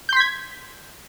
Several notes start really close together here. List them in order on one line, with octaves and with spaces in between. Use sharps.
G6 C6 B6 G#6